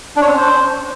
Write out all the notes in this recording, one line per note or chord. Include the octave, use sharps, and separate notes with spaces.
D4
C#5
C4
C#4
C5